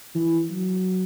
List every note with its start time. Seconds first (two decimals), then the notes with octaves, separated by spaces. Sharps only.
0.15 E3
0.51 F#3